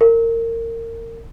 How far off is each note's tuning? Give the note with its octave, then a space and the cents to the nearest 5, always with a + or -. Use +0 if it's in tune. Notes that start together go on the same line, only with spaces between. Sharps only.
A#4 -25